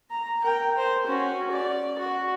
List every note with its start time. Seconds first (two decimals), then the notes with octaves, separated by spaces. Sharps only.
0.11 A#5
0.44 A#4 G5
0.77 C5
1.07 C#4 F#4
1.51 D5
1.99 F#4